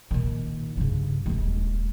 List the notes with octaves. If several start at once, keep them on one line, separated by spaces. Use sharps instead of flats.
A#2 D#3
G2 C#3
D#1 G#3